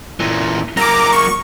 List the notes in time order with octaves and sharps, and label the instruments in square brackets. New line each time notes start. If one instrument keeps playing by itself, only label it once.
[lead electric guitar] A#2 E3
[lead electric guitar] F#3 A#3 [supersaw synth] A#5 D6
[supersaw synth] C#6